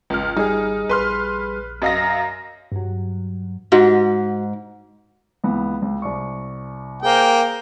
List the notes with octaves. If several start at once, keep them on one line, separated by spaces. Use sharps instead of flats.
G#1 C#2 F6
G3 D#4 G#4
A#1 B4 C6 F6
F#2 D#5 F5 A#5 A#6
G2 F#3
G#2 F#4
C#2 E3 B3
C#2
C2 D5 C#6
A#3 G#4 C5 F5 G5